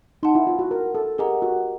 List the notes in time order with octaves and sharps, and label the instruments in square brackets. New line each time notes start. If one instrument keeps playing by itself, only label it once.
[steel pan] D#4 [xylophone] F#5 A5 C6
[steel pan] E4
F4
F#4
A#4
A4
[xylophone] G4 A#4 D#5 F#5 A#5 [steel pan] G#4
[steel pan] F#4